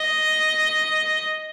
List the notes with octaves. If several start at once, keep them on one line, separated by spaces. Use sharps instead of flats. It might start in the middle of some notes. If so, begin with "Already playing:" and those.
Already playing: D#5